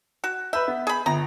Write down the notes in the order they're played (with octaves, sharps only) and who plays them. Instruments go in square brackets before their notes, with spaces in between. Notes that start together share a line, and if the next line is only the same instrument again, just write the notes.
[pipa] F#4
[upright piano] B4 G6 [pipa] E5
[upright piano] B3
[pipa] G#4 B5
[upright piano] G1 [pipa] A#5